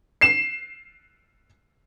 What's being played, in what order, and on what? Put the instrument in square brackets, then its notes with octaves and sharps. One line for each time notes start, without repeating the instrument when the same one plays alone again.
[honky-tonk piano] C7 E7